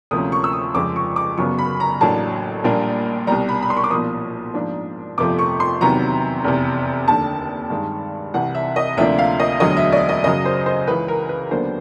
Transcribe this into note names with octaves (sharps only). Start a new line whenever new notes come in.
D2 C3 F3 A#3 C#4 D#6
C#6
E6
D#6
F1 F2 C#3 F3 G#3 D6
C#6
D6
G1 F#2 C#3 F#3 B3 C#6
B5
A#5
A1 A2 F#3 A#3 D4 A5
A#1 A#2 G3 A#3 D4
C2 B2 G3 A#5
B5
B5
C6
C#6
D6
B1 A#2 F3 D#6
G#2 F3 A#3 D4
G1 F2 C3 F3 A3 D6
C#6
C6
E2 C3 D#3 F#3 B3 A#5
F1 E2 C3
F1 D#2 D3 A5
G2 D#3 G#3
C2 C3 E3 F#5
E5
D#5
D2 C3 F3 A#3 D4 E5
F5
D#5
E1 D2 D3 F#3 D#5
E5
D5
D#5
F#2 C#3 F#3 D#5
C5
C5
C#2 C#3 E3 B4
A#4
B4
D#2 D3 F#3 B3 D4 C5